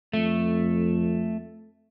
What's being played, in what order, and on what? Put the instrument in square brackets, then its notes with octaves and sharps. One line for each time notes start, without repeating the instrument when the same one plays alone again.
[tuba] F2 [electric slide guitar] A3